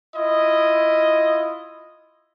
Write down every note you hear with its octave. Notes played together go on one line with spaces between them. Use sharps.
E4 F4 D#5